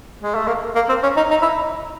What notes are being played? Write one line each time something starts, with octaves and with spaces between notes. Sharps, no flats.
G#3
A3
A#3
A#3
C4
C#4
D#4
D#4
E4